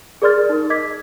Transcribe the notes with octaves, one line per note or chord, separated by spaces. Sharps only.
G#4 A#4 D5 C6 F6 A6
D#4 A#4
D#5 D6 G#6 B6